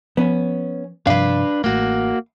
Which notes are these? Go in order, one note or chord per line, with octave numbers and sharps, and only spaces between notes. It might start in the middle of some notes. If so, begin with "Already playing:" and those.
F3 B3 C#4
G2 C3 F3 D4 B4 F5
A1 A3 A#3 F#4